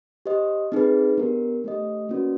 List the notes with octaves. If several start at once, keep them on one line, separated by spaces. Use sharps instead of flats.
G4 C5 D#5
C4 D#4 G#4 B4
B3 D4 G4 A#4
A3 D4 G4 C5 D#5
A#3 C#4 F#4 B4 D5